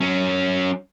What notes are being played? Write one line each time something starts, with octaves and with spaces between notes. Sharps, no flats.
F#3 C#4